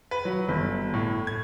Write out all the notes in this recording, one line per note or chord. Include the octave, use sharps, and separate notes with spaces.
B4
F#3
G1
A2
G#6